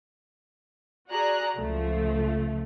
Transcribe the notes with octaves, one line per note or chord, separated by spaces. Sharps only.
F#4 G#4 D5 A#5 F#6
C#2 F3 A3